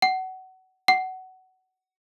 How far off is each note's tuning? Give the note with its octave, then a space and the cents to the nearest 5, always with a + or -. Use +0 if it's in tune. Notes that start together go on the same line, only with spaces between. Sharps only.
F#5 +25
F#5 +20